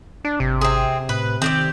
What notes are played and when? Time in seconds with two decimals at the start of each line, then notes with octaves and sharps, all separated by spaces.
0.25 D4
0.40 G#1 C3
0.61 C4 G#4
1.09 A2 B4
1.42 D#3 C4 G4 D5